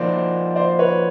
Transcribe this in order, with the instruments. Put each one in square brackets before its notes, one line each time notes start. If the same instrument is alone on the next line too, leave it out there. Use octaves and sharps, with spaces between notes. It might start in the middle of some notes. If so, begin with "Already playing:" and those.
Already playing: [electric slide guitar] F3 A#3 D#4 F#4 [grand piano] C5 D5
[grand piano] C5 D5
B4 C#5